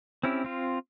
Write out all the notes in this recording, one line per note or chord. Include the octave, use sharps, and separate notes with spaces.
C4 C#4 E4 G4
C4 F4